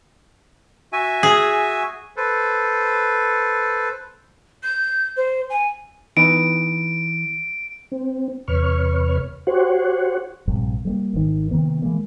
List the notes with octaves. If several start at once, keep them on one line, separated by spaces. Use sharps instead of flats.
F#4 E5 G#5
G#4
A4 B4 C5
G6
C5
G#5
E3 B3 D#4 D7
C4
E2 C3 B4 C#5 C#6 F6
F#4 G4 C5 C#5 F#5
A#1 G2 C3
G3 G#3 A#3
G#1 D#3
C3 D#3 A#3 B3
E3 G#3 A#3